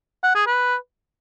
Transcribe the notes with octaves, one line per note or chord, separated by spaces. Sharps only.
F#5
G#4
B4